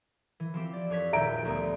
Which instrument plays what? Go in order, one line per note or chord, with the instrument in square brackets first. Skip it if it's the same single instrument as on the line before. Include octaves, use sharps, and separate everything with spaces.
[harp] E3
F3 C4 G4
D5
F2 C#5 B6
[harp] D#1 G6 [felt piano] E5 A#5 D7
[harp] D2 A3 B3